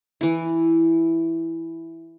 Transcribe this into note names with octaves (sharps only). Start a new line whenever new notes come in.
E3 E4